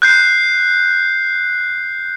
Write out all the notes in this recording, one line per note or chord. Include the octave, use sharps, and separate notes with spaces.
F#6 G6 C7